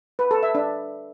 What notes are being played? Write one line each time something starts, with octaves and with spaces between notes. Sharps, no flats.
B4
A4
E5
D4